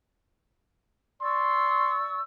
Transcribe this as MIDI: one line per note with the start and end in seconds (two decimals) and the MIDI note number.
1.21 2.19 74
1.21 1.96 84
1.21 2.19 85
1.21 2.19 88